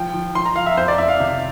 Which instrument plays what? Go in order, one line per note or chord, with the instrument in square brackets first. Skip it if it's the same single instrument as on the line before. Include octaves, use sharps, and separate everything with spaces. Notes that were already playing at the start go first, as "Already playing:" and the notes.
Already playing: [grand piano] F3 G5
F3
F3 C6
A#5
F3 F5
E5
F2 C5
D5
F2 E5
F5
C3